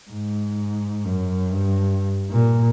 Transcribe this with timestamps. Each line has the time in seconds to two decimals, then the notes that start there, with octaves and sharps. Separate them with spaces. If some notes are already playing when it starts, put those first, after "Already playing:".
0.10 G#2
1.05 F#2
1.51 G2
2.30 A#2